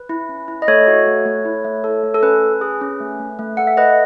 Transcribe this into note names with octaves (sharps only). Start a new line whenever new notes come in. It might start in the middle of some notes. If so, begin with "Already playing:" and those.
Already playing: B4
E4
C#4
E4
D#5
A3 A4 C#5
F#4
A3
A3
E4
A3
A4
A3
A4
C#4 B4
C#4
G#4
C#4
A3
A3
A3
A4 F#5
E5
A4 B4 D#5